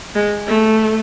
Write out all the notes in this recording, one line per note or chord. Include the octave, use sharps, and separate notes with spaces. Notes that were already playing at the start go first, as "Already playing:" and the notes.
G#3
A3